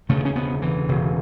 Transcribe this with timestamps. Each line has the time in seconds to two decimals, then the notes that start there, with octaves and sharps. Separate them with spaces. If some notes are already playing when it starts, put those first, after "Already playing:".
0.09 E1 D2 C#3 A3
0.25 C#4
0.36 B3
0.62 E3
0.89 E1 D2 C#3